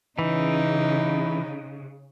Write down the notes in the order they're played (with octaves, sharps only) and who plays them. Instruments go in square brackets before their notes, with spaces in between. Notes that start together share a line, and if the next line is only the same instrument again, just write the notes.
[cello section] C#3 [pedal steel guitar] E3 [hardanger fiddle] D#4